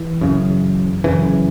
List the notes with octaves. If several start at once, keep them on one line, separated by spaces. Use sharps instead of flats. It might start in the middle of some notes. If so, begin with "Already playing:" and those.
Already playing: E3
F#2 C#3
F#2 C#3 E3